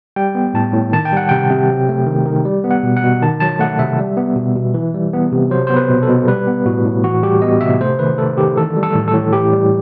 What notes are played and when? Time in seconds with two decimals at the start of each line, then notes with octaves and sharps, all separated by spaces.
0.16 G3 G5
0.35 B3
0.54 A2 A5
0.73 A2
0.93 D#3 A5
1.05 G5
1.12 G3 F#5
1.29 C3 G5
1.50 C3
1.69 F#3
1.89 A3
2.07 D#3
2.26 D#3
2.45 G3
2.64 B3
2.71 F#5
2.83 B2
2.97 F#5
3.03 B2
3.22 D#3 A5
3.40 F#3 A5
3.60 A3 F#5
3.79 C3 E5
3.99 G3
4.17 B3
4.36 B2
4.56 B2
4.74 E3
4.94 G3
5.13 B3
5.32 C3
5.51 F#3 C5
5.67 B3 C5
5.76 B4
5.90 B2
6.03 A4
6.09 B2
6.28 G3 B4
6.47 B3
6.65 A2 F#4
6.84 A2
7.04 E3 F#4
7.23 G3 G4
7.42 B3 D#5
7.61 C3 E5
7.81 A3 C5
7.99 D#3 B4
8.18 A3 A4
8.37 D#3 G4
8.57 E3 A4
8.76 G3
8.83 A4
8.94 A2
9.08 A4
9.14 A2
9.33 E3 G4
9.53 G3